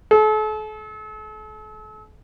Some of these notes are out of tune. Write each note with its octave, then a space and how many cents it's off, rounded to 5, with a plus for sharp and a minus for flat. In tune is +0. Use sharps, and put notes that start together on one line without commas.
A4 -40